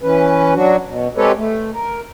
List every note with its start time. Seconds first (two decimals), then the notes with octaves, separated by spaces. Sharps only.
0.01 E3 C#4 B4
0.54 F#3 D4 F#4
0.87 B2
1.16 G#3 C4 G4 A4 B4 C#5
1.37 A3
1.72 A#4